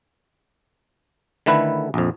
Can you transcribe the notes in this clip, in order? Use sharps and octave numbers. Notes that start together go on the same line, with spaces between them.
D3 D#3 A3 E4 B4
A#1 F2